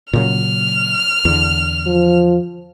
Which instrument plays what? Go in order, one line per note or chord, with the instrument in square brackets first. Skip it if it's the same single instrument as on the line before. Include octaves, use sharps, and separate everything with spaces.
[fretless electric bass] A#2 C#3 F#3 [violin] F6
[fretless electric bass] E2 D3
[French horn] F3